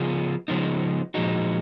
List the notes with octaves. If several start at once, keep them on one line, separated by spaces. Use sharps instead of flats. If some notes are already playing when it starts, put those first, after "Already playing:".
Already playing: C#3 F3 B3 F4 G#4
C#3 F3 G#3 B3 D#4
A#2 F3 G#3 D#4 F#4